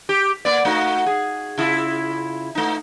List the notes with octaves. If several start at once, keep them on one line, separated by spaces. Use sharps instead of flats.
G4
A#3 D5
A3 D#4 F#4
G#4
C#3 E4 F4
A3 D#4